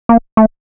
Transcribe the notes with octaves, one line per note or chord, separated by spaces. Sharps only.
A#3
A3